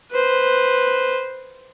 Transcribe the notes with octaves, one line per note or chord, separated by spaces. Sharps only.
B4 C5